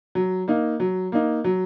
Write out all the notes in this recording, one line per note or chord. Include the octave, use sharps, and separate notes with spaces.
F#3
A#3 D#4
F#3
A#3 D#4
F#3